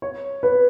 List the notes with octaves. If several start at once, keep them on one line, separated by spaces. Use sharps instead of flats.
C#5
B4